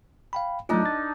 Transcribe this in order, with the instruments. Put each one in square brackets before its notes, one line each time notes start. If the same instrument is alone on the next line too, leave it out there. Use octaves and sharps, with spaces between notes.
[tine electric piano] F5 G5 B5
[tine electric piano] F#3 A3 F4 [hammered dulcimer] D4 D#4 A4
[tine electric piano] A6